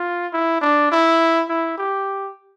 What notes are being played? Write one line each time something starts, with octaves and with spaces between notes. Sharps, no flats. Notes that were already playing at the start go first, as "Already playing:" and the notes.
Already playing: F4
E4
D4
E4
E4
G4